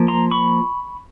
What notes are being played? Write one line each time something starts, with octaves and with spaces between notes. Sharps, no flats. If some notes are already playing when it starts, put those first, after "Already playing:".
Already playing: F3 A#3
A#5 C6
B5 C#6